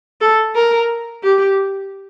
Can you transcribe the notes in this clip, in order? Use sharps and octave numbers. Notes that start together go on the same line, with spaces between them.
A4
A#4
G4